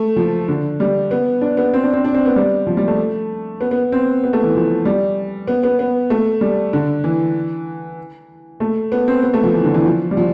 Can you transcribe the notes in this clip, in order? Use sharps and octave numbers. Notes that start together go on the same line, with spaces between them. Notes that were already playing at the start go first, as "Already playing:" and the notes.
Already playing: A3
F3
D3
G3
B3
D4
B3
C4
D4
C4
D4
C4
B3
G3
F3
G3
A3
B3
B3
C4
B3
A3
E3
F3
G3
B3
B3
B3
A3
G3
D3
E3
A3
B3
C4
B3
A3
F3
E3
D3
E3
F3
G3
F3